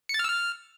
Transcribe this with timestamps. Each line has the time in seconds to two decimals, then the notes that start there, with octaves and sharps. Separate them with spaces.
0.09 C#7
0.14 A6
0.19 F6
0.24 E6
0.29 F6